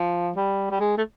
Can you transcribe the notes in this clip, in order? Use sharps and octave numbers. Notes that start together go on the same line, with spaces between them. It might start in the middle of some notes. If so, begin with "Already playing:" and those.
Already playing: F3
G3
G3
G#3
A3